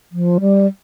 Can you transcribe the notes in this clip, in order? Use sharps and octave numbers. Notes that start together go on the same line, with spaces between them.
F3
G3